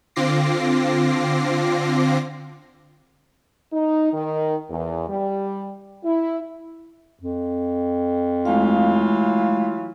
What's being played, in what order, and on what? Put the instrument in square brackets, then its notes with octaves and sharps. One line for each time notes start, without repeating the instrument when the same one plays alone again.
[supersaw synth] D3 C4 F4 D6 A#6 C7
[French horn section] D#4
D#3
E2
G3
E4
[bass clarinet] F2
[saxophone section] E3 F#3 F4 [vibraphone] G#3 A3 F5